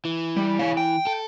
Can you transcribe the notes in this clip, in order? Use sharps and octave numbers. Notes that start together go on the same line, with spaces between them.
E3
G3
C#5 F5
G5
A4